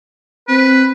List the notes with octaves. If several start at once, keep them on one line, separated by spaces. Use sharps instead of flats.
C4 B4